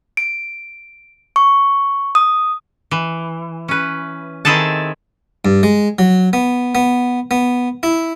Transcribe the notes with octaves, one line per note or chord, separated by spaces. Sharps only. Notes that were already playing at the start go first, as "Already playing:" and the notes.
D7
C#6
D#6
E3
C#4 B4
D#3 C4 E4 G#4 A4 A5
G2
G#3
F#3
B3
B3
B3
E4